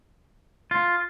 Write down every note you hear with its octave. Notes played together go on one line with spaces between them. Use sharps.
F4